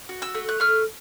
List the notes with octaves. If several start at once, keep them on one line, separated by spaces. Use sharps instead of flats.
F#4
E6
A3
F#6
A3 F6